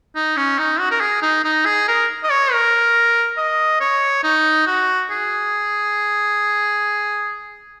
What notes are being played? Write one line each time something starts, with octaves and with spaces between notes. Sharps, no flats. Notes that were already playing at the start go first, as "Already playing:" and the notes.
D#4
C#4
D#4
F#4
A#4
G#4
D#4
D#4
G#4
A#4
D#5
C#5
A#4
D#5
C#5
D#4
F#4
G#4